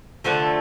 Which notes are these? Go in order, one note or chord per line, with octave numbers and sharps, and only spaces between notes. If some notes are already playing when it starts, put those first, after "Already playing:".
D3 F3 A3